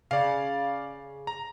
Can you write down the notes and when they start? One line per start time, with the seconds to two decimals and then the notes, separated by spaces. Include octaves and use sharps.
0.11 C#3 D5 F5
1.27 A#5